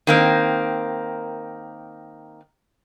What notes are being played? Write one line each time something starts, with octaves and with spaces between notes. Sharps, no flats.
D#3 A#3 C4